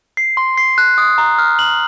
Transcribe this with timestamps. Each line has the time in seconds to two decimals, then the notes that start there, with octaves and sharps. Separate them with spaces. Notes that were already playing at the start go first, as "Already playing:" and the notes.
0.17 C7
0.37 C6
0.58 C7
0.78 F#6
0.98 D#6
1.18 A#5
1.38 F6
1.59 F#7